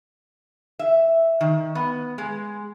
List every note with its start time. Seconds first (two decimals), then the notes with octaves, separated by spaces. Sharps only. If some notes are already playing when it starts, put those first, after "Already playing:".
0.79 E5
1.41 D#3
1.75 B3
2.18 G#3